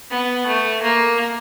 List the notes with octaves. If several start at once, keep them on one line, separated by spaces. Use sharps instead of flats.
B3
A3
A#3